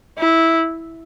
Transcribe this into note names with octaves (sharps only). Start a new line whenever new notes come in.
E4